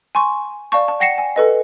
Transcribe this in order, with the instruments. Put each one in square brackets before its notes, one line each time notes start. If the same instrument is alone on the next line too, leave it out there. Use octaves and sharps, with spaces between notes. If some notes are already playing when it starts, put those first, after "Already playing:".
[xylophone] G#5 C6 C#6
D5 F5 A5 C#6
A5
F#5 G5 A#6 C7 C#7 E7
G#5
A4 B4 D#5